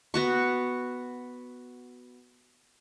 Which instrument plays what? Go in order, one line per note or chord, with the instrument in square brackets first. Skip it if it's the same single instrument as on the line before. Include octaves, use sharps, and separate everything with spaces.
[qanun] B3 F#4 C#6